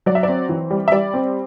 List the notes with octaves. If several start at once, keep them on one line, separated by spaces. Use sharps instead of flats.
F#3 D5
E5
D5
C4
E3
G3
E5
G3 D5
C4